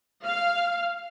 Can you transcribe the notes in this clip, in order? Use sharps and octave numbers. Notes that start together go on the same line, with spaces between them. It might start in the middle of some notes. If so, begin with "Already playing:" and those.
F5